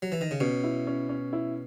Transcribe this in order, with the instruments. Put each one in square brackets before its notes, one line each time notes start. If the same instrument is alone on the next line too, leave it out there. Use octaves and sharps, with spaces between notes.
[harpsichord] F#3
E3
D#3
C#3
[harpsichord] B2 [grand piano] C#4
[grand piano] E4
C#4
C#4
E4